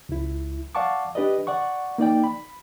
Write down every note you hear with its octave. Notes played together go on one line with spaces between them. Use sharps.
C#2 E4
D5 F5 F#5 A5 C#6 D6
D4 G4 B4 D5 D#5
D5 F#5 C#6
A#3 D#4 D5 G5
B5